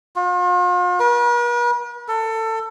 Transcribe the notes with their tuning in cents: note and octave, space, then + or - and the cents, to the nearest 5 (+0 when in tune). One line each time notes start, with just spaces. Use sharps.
F4 +40
B4 -45
A4 +25